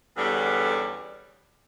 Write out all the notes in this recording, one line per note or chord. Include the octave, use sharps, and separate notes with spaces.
E2 D3 G3 C#4